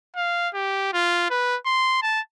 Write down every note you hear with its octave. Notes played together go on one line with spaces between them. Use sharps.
F5
G4
F4
B4
C6
A5